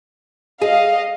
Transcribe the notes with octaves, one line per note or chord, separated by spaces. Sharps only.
G#4 D#5 F5